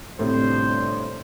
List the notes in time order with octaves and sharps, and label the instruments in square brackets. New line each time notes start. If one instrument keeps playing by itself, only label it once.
[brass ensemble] G1 D4 C5 [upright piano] A2 C3